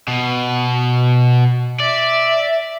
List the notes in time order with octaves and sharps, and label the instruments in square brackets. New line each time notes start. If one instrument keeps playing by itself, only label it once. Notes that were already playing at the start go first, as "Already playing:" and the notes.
[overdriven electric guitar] B2
[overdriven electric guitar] D5 [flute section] E5